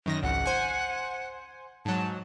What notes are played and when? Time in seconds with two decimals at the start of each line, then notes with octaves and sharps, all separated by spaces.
0.06 F#2 D#3 A#6
0.23 G#1 C#2 F#5
0.46 C5 G#5
1.85 G#2 F#3 A5